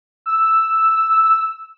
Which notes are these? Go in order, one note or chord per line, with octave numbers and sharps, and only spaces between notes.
E6